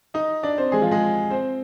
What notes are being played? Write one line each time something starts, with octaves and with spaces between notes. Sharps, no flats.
D#4 D#5
D4 D5
C4 C5
G#3 G#4
F3 F4
G#3 G#4
C4 C5